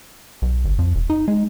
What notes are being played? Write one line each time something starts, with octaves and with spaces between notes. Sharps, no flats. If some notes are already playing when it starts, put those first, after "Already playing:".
B1
G1
F2
E1
D#4
G#3